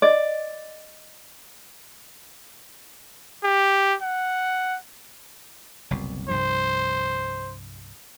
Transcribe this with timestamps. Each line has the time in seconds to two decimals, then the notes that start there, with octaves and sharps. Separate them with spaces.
0.02 D5 D#5
3.44 G4
4.02 F#5
5.91 F#1 C2 B2
6.29 C2 G2 F3 C5